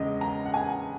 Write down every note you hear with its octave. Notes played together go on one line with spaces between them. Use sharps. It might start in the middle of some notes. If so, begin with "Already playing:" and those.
Already playing: E2 C#3 G#3 D#5
A#5
F#5
G#5